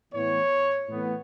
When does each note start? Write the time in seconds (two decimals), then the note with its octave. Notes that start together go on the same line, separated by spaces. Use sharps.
0.13 A2 E3 B3 C#5
0.89 A2 E3 B3